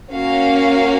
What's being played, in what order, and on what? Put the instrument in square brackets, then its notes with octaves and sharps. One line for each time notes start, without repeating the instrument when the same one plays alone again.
[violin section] A#3 C#4 F#4 F5